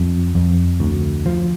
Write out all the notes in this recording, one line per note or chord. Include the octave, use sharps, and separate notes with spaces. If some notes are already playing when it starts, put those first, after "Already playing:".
Already playing: F2
F2
D2
F3